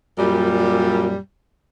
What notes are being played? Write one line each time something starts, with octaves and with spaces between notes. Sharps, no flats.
F#2 A#2 G3